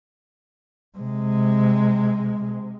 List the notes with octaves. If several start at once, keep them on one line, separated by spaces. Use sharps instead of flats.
C3 G#3